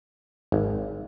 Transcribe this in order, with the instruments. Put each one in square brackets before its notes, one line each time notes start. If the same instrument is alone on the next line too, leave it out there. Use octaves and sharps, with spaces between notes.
[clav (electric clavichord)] G#1